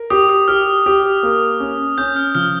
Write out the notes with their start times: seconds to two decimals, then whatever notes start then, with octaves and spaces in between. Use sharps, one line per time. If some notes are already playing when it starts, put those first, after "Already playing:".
Already playing: A#4
0.10 G4 D#6
0.29 D#6
0.48 G4 F6
0.86 G4
1.23 A#3
1.60 C#4
1.98 C#4 G6
2.16 F6
2.35 F3 F6